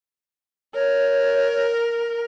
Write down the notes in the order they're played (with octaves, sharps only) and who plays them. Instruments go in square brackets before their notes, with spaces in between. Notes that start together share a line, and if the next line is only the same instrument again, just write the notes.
[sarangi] A#4 [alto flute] C#5